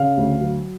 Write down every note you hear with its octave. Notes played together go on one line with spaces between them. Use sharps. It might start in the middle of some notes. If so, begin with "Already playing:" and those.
Already playing: C#3 F5
D2
F#3